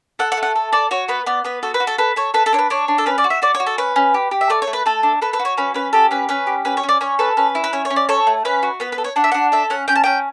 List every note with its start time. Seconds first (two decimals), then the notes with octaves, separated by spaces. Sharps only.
0.19 A4 F#5
0.32 F#5
0.37 A3
0.43 F#5
0.55 A4
0.73 A4 D5
0.91 F#4 C#5
1.08 B3 B4
1.26 B3 D5
1.45 B3 B4
1.63 F#4 A4
1.74 B4
1.80 F#4
1.87 A4
1.98 A4 B4
2.16 A4 C#5
2.34 A4 B4
2.46 A4
2.53 D4 C#5
2.59 B4
2.70 D4 C#5
2.88 D4
2.98 A4
3.06 C#4 B4
3.18 D5
3.24 F#4
3.30 E5
3.42 F#4 D5
3.55 C#5
3.60 F#4
3.67 A4
3.78 C#4 B4
3.96 C#4
4.14 G4
4.31 G4
4.41 E5
4.50 A3 D5
4.62 C#5
4.67 A3
4.73 B4
4.86 A3 A4
5.03 D4
5.22 A4 B4
5.33 B4
5.39 F#4
5.45 C#5
5.58 C#4 B4
5.74 C#4 B4
5.93 G4 A4
6.11 C#4 B4
6.29 C#4 B4
6.47 G4
6.65 C#4 B4
6.77 C#5
6.83 C#4
6.89 D5
7.01 C#4 C#5
7.19 A4 B4
7.37 C#4 B4
7.55 E4
7.64 B4
7.73 C#4 C#5
7.85 C#5
7.90 C#4
7.96 D5
8.09 A4 C#5
8.27 A3
8.45 C#4 B4
8.63 F#4
8.80 B3 B4
8.92 B4
8.98 A4
9.04 C#5
9.16 D4 F#5
9.24 E5
9.32 D4 F#5
9.52 A4 E5
9.70 C#4 F#5
9.88 C#4 G5
9.96 A5
10.04 C#4 G5